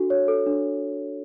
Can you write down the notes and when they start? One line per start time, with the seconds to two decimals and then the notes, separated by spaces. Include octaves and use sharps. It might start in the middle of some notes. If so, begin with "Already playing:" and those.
Already playing: D4 F#4 A4
0.10 C#5
0.28 A4
0.46 D4